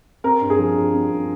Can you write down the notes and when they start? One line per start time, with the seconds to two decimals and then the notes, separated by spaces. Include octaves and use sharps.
0.24 C4 A#4
0.41 G2
0.50 G#4
0.59 F3
0.76 G2
0.93 C4
1.10 G2